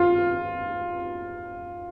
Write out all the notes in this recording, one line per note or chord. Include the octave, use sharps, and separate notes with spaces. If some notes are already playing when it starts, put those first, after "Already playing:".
Already playing: F4